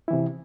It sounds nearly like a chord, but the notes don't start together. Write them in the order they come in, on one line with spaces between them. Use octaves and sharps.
E4 E3 C3